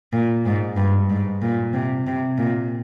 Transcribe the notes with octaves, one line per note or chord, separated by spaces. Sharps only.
A#2
G#2
G2
G#2
A#2
C3
C3
A#2